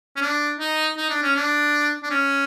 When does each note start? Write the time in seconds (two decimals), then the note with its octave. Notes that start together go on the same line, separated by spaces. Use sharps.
0.16 C#4
0.22 D4
0.60 D#4
0.97 D#4
1.10 D4
1.22 C#4
1.36 D4
2.03 D4
2.11 C#4